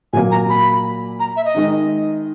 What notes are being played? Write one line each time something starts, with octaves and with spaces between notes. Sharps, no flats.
A#2 F#3 A#3 G#5
A#5
B5
A#5
E5
D#5
D#3 G#3 D#4